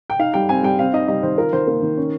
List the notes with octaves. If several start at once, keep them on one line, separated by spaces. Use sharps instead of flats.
G5
D#4 F5
G3 G5
C4 G#5
G3 G5
C4 F5
D#4 D#5
G3 D#5
D#3 C5
F4 A#4
D#3 C5
A#3 A#4
D#3
C#4